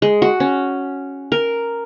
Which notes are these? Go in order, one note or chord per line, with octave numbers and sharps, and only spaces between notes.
G#3
F#4
C#4
A#4